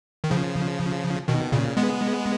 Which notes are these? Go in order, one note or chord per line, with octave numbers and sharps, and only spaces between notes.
D#3
C#3 F3
B2 D#3
A#2 C#3
G#3 B3